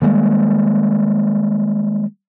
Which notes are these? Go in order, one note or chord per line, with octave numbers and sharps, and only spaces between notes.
D#3 G3 G#3 A#3